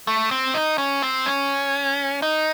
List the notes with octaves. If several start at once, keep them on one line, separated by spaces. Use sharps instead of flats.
A3
C4
D#4
C#4
C4
C#4
D#4